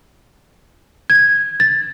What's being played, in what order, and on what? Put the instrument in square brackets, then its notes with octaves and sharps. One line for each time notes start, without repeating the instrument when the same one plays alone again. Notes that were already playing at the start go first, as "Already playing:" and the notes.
[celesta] G#6
A6